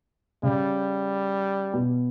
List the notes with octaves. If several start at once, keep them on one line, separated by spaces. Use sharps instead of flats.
C#3 G3
B2